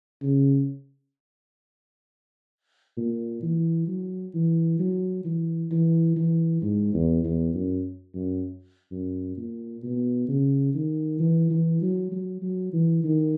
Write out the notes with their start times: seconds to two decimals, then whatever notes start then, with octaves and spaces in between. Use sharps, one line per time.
0.22 C#3
2.97 A#2
3.42 E3
3.87 F#3
4.34 E3
4.79 F#3
5.25 E3
5.71 E3
6.16 E3
6.62 G#2
6.94 E2
7.24 E2
7.55 F#2
8.14 F#2
8.91 F#2
9.37 A#2
9.83 B2
10.28 C#3
10.74 D#3
11.20 E3
11.50 E3
11.82 F#3
12.12 F#3
12.42 F#3
12.73 E3
13.04 D#3